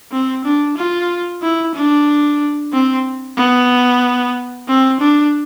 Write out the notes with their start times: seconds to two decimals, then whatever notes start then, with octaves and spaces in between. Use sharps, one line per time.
0.12 C4
0.45 D4
0.77 F4
1.42 E4
1.75 D4
2.73 C4
3.38 B3
4.68 C4
5.00 D4